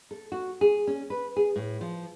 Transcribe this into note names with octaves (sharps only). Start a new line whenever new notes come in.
A4
F#4
G#4
C#4
B4
G#4
A2
F3